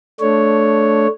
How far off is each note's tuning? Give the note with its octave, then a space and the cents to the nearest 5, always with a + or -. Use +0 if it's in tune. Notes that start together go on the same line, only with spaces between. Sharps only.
A3 -5 D4 +0 C#5 +0